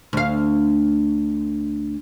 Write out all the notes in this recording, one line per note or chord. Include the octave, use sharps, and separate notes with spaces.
D2 F5